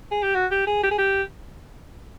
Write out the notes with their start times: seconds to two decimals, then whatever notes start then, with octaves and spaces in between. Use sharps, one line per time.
0.11 G#4
0.23 G4
0.35 F#4
0.51 G4
0.67 G#4
0.83 G4
0.91 G#4
0.98 G4